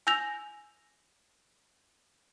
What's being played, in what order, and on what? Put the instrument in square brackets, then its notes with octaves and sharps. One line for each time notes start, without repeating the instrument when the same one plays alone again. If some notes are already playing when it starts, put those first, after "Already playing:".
[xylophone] G#5 E6 G6 A#6 F7